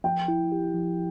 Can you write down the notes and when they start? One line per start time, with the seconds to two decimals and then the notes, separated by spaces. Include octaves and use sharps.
0.04 F3 G5
0.28 E4
0.52 G4
0.74 F3